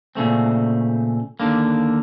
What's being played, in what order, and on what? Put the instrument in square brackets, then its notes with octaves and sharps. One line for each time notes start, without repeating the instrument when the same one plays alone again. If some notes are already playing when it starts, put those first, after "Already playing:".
[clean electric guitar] A#2 C#3 A3 C4
D#2 D3 A#3